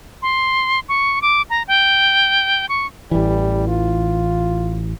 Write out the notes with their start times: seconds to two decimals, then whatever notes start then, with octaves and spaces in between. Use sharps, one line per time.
0.22 C6
0.89 C#6
1.22 D6
1.50 A#5
1.68 G5
2.69 C#6
3.11 A1 E3 G3
3.68 F4